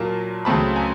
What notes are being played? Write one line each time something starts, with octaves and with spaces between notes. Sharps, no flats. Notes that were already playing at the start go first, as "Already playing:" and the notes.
Already playing: A#2 F#3 A#3 A5
C#2 C#3 F#3 A3 C4 A5 B5
G#5 A#5